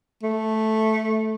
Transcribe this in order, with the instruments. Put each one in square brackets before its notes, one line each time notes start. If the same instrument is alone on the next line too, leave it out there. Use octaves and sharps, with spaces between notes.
[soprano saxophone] A3